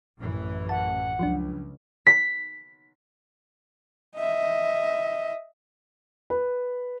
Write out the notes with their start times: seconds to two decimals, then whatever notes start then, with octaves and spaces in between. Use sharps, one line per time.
0.18 A1 F#2 E3
0.69 F#5 A5
1.19 C#2 F3 F#3 D4
2.07 B6
4.16 D#5 E5
6.30 B4